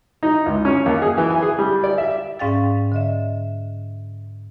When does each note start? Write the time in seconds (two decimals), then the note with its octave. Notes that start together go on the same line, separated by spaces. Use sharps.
0.23 D#4
0.46 C#2
0.65 C#4
0.86 D#2
1.02 G#4
1.18 E3
1.30 G#5
1.42 G#4
1.58 G3
1.84 D5
1.98 E5
2.39 G#2 C#4 D5 F5 G5 A6
2.92 D3 D#5 E5